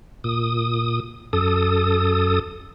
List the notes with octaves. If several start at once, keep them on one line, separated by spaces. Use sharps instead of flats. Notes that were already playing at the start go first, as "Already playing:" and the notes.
A#2 D#6
F#2 A4 D#6